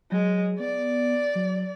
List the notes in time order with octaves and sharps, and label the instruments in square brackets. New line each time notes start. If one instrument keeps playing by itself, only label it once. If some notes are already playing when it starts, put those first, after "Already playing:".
[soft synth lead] F#3 [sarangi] G#3
[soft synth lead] B3 [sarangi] D5
[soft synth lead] F#3